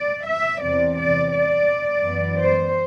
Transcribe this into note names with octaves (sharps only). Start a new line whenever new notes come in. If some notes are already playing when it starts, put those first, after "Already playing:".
Already playing: D5
E5
E2 C3 E3 D5
D5
D5
F#2 E3 B3
C5